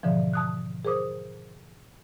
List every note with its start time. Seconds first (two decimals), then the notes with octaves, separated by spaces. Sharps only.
0.03 G#2 B2 D3 E3 F3
0.33 A5 D#6 F#6
0.85 G#4 A#4 C5 D6 D#6